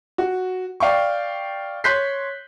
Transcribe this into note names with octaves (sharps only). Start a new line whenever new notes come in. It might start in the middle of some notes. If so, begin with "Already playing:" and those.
F#4
D5 F5 G5 C#6
C#5 C6 F#6 G6 B6 C7